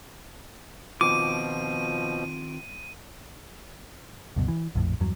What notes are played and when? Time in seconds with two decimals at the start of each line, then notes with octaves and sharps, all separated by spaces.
1.01 B2 D#3 F3 C4 F4 D6 D#7
4.36 C#2 F#2 B2
4.48 E3
4.75 A#1 F2 A2
5.00 E2 G2 F#3